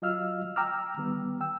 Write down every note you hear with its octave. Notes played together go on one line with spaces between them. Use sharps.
F#3 F4 D#5 F5 E6 F6
G5 A#5 D6 E6 F6
D#3 G3 B3
G5 E6